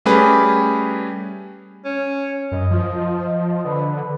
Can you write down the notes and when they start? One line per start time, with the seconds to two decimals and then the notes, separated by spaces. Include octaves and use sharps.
0.05 G3 A3 C#4 G4 G#4 B4
1.85 C#4
2.52 F#2 D#5
2.71 F3
3.65 D3 B4